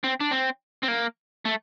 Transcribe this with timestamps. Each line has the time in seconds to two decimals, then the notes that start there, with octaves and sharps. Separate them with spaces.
0.04 C4
0.20 D4
0.31 C4
0.83 C4
0.88 A#3
1.45 A3